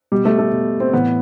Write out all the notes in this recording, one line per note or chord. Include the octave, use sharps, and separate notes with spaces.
B2 G3
A3
A3
B2
C4
A2 E3 B3